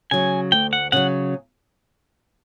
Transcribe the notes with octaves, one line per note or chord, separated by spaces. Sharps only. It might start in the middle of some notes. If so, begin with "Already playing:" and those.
C#3 F#3 G#5
D2 G5
F#5
C#3 F#3 F#5